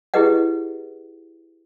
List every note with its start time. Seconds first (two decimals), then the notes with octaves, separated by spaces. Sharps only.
0.14 E4 G4 G#4 B4 D#5 F#5